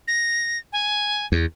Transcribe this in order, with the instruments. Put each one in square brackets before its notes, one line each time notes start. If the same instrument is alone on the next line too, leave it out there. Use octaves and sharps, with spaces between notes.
[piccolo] A#6
G#5
[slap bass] E2